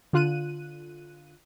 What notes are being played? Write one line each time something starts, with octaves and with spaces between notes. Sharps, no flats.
D3 F4 F#6 D#7